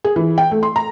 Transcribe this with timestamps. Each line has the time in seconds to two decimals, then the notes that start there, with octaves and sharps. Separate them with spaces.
0.04 G#4
0.16 E3
0.38 G5
0.51 A3
0.63 C6
0.76 A#5